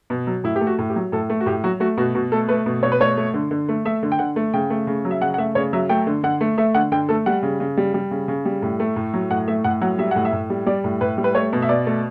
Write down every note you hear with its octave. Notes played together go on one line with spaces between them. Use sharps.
B2
F#3
A2 E4
G4
A3
F#4
A2
G4
F#3
A2 A4
A3
F#4
A2 G4
F#3 F#4
A3 F#4
B2 F#4
B2 F#4
A3 A4
A3 B4
B2
B2 C#5
B4
A3 C#5
A3
D3
D3
A3
A3 E5
D3
G5
D3 F#5
A3
C#3 G5
A3
C#3
F#3
E5
C#3 F#5
F#5
A3 E5
C#3 C#5
F#3 E5
A3 G5
D3
D3 F#5
A3
A3 E5
D3 F#5
D3 G5
A3 A4
G3 F#5
C#3
C#3
G3
G3
C#3
C#3
G3
A2
A3
A2
F#3
A2 F#5
A3 E5
A2 F#5
F#3 F#5
G3 E5
A2 F#5
E5
A2
G3
G3 D5
A2
A2 B4
G3
B4
A3 C#5
B2
E5
B2 D5
A3